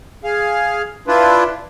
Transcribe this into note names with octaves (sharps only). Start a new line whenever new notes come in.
G#4 F5
D4 E4 F4 B4